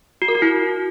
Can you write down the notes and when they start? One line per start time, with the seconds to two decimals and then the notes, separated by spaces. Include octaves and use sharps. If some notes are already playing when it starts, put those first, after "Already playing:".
0.22 F#4
0.28 A#4
0.35 F#4
0.42 E4